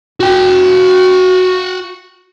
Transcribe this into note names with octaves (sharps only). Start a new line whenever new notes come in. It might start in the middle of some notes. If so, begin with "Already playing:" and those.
F#4 G5